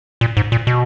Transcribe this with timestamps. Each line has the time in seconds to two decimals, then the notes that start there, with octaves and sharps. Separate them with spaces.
0.21 A#2
0.37 G#2
0.52 A#2
0.67 B2